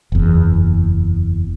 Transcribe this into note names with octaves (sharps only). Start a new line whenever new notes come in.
F#1 E2